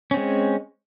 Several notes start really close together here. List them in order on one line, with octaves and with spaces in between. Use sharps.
C#4 C4 G#3